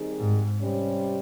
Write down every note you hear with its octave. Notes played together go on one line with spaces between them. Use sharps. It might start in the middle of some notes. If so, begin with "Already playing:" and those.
Already playing: D#3 G3 C4 D#4 G#4
G#2
C3 G3 C#4